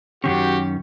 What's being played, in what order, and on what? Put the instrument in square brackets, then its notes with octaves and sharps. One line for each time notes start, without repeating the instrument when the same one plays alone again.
[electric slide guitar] F#2 D#3 C#4 [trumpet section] F#4 G4